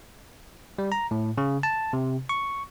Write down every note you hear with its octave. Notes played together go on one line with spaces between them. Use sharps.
G3
A#5
A2
C#3
A5
C3
C#6